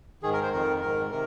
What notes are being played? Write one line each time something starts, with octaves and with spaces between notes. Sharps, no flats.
G#2 D#3 G#4
A#4
C5
F2 D#3 A#4
G#2 D#3 A#4
C3 D#3 A#4